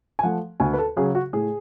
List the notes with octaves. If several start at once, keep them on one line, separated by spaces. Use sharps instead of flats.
G#5
F3 A3 F#5
D2 G#5
B4
A4
C#3 F#3 G#4
F#4
A2 G#4